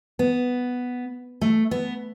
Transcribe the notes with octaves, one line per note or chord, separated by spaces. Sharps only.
B3
A3
B3